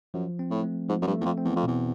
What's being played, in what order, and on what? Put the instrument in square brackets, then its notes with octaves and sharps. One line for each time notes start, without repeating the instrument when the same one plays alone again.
[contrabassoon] F#2 [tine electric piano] F3
[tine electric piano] C4
[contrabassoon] A2
[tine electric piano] A3
[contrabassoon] G#2 [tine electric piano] F3
[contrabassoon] F#2
G2
[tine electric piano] A3
[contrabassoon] E2
F2
[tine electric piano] C4
[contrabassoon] E2
F2
[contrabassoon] E2 [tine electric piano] B2